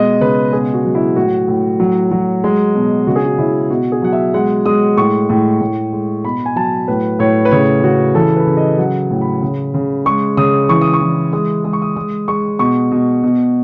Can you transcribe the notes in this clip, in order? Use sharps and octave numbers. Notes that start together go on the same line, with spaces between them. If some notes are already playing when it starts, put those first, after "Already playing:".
Already playing: B2 G#3 D#5
C#3 B4
B2 G#4
F#4
F#3
E4
A2 F#4
A2
F#3
F#3
G#3
B2
C#3 F#4
G#4
F#4
C#3 E4
B2 F#4
G#4
F#3 F#5
E5
G#3 F#5
G#3 D#6
A2 C#6
A2
A2
G#3
B2 B5
G#5
F#3 A5
A2 B4
A2 C#5
B4
C#3 C#5
C#3 F#4
E3 A4
B4
C#3
D#5
F#3 F#5
A2
B5
C#3
C#3
G#3 C#6
C#3 D#6
E3 C#6
D#6
C#6
E3
G#3 D#6
G#3 D#6
C#6
D#6
G#3 D#6
G#3 C#6
B2 C#6
B2
B2